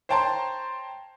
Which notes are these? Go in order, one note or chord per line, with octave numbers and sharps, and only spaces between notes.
C5 C#5 G5 A5 A#5 C6